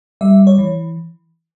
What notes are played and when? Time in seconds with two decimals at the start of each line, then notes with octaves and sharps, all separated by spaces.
0.21 G3 E5
0.47 C#5
0.58 E3